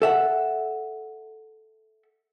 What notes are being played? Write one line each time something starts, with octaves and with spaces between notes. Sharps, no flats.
A4 E5 F#5